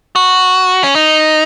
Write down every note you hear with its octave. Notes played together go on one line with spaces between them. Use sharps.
F#4
C#4
D#4